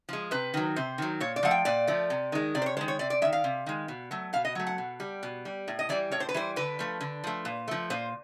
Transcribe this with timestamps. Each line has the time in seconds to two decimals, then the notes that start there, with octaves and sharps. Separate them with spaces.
0.09 F3 G#3
0.31 C3 B4
0.54 D#3 F#3
0.76 C3 C5
0.98 D#3 F#3
1.20 A#2 C#5
1.36 D5
1.43 F3 A3 F#5
1.51 G5
1.65 A#2 D5
1.87 F3 A3
2.10 C3
2.32 D#3 G#3
2.55 C3 D5
2.62 C5
2.66 C#5
2.77 G#3 C5
2.81 D#3
2.88 C#5
2.99 C3 D5
3.10 D5
3.22 G#3 E5
3.25 D#3
3.33 F5
3.44 C3
3.66 D#3 G#3
3.88 B2
4.11 F#3 A3
4.33 B2 F5
4.45 D#5
4.55 F#3 A3
4.67 F#5
4.78 B2
5.00 G3
5.23 B2
5.45 G3
5.68 A2
5.79 D#5
5.89 E3 G3 D5
6.11 A2 C#5
6.20 C5
6.29 B4
6.34 E3 G3 C5
6.56 D3 B4
6.79 F3 A3
7.01 D3
7.24 F3 A3
7.45 A#2
7.68 F3 A3
7.90 A#2 C5